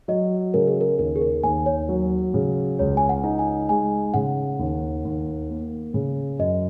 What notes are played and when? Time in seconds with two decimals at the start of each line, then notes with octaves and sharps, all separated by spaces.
0.08 F#3 D#5
0.54 C#3 A#4
0.68 G#4
0.81 A#4
0.99 D#2 A#4
1.16 G#4
1.21 A#4
1.43 D#2 G#5
1.66 C#5
1.89 F#3
2.34 C#3
2.79 C#2 C#5
2.97 G#5
3.09 F#5
3.24 D#4
3.39 G#5
3.69 G#3 G#5
4.14 C#3 F#5
4.59 D#2
5.05 D#2
5.50 A#3
5.94 C#3
6.39 F#2 D#5